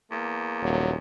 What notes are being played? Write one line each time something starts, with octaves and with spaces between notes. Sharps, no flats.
E2 A#3
D#1 F#3